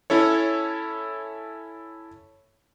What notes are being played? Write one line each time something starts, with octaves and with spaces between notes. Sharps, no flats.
C#4 E4 A4 C#5